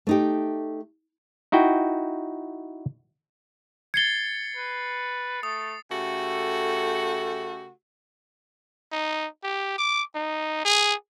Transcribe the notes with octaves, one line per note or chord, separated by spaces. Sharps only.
A3 D#4 G4
D#4 E4 F#4 G5
G#6 A6 C7 C#7 G7
B4
A3 D#6
C#3 A3 F#4 G4 A4
D#4
G4
D6
D#4
G#4